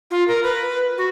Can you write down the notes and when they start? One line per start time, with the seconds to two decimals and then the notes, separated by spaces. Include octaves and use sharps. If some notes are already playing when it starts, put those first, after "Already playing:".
0.11 F4
0.28 A#4
0.43 B4
0.98 F#4